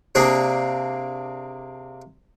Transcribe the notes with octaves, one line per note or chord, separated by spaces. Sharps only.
C3 A#3 C4 D4 G#4